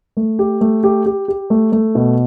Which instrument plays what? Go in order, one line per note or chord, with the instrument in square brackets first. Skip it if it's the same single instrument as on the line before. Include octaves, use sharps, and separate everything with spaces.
[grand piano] A3
G4
A3
G4
G4
G4
A3
A3
B2